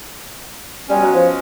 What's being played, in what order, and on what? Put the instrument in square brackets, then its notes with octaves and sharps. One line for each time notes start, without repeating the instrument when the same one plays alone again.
[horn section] B2 G#3 C#4 [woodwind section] G3
[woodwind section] F#3
F3